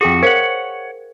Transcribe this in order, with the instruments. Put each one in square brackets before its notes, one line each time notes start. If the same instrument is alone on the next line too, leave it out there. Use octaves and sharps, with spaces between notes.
[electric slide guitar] F2 F#4 [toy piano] G#4 A4 G5
[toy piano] A#4 C5 F5 [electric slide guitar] C#5 F#5